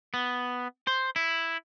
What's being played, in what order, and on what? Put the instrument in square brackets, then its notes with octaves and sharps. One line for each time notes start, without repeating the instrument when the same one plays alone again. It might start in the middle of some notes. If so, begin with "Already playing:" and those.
[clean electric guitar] B3
C5
E4